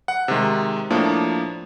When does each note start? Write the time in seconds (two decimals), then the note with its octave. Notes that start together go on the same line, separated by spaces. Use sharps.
0.08 F#5
0.28 C3 D#3 G#3
0.90 A2 F3 A#3 D4